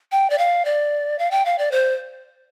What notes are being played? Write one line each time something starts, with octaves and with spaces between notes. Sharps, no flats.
G5
D5
F5
D5
F5
G5
F5
D5
C5